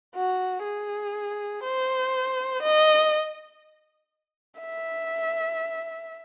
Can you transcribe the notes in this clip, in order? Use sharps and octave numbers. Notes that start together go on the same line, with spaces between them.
F#4
G#4
C5
D#5
E5